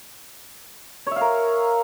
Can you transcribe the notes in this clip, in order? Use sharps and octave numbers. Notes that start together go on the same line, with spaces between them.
A#4 C#5 E5 F5